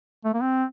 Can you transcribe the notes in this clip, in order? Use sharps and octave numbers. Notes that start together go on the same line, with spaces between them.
A3
A#3
C4